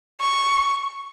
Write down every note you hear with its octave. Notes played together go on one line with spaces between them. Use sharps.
C#6